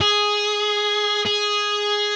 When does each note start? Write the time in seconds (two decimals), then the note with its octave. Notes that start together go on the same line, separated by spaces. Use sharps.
0.01 G#4
1.26 G#4